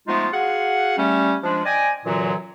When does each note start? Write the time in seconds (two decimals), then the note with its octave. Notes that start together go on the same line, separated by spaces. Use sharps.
0.07 F3 G#3 A3 B3 D#4 F4
0.32 F#4 G#4 F5 F#5
0.97 G3 A3 C#4
1.43 F3 G#3 D4
1.65 D5 D#5 G5 G#5
2.05 F#2 A#2 D3 E3 F#3